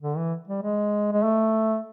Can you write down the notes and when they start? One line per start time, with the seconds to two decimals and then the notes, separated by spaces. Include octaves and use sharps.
0.02 D3
0.17 E3
0.48 G3
0.63 G#3
1.12 G#3
1.23 A3